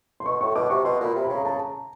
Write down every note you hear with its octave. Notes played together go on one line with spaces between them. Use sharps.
C6
B2 C#6
A2 C#6
B2 D6
C3 C#6
B2 C6
A#2 B5
C3
C#3 B5
A#5
C#3 A5
A#5